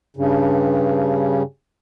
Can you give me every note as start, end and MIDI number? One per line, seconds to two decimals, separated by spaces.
0.16 1.42 43
0.16 1.42 49